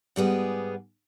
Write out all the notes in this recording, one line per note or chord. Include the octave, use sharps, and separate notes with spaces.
G#2 G3 B3 G#4